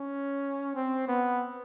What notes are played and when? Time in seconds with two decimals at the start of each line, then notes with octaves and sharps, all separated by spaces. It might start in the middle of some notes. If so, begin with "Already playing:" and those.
Already playing: C#4
0.75 C4
1.08 B3